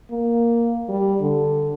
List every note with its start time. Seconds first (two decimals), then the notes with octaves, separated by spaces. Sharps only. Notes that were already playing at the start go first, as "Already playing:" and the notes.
0.11 A#3
0.89 G3
1.21 D3